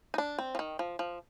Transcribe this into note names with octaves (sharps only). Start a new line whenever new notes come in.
D#4
D4
C4
F3
D#3
F3
F3